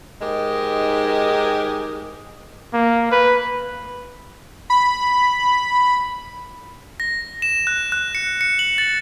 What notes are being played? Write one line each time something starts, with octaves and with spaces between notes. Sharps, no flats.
G#2 G#3 D#4 G4 A#4
A#3
B4
B5
A#6
E7
F#6
F#6
C#7
C#7
F#7
A6